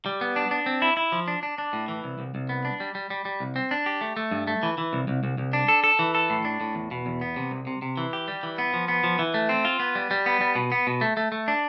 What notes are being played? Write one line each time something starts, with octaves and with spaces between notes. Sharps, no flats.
G3
B3
D4
D4
C4
E4
E4
F3
D4
D4
D4
A2
E3
C2
C2
C2
B3
D4
G3
G3
G3
G3
C2
C4
D4
G4
A3
A3
G2
A3
E3
E3
C2
C2
C2
C2
D4
A4
A4
E3
A4
A2
D4
A2
E2
B2
E2
B3
C3
C2
C3
C3
E3
G4
G3
E3
B3
F3
B3
F3
E3
A3
C4
F4
B3
G3
G3
B3
G3
B2
B3
B2
A3
A3
A3
D4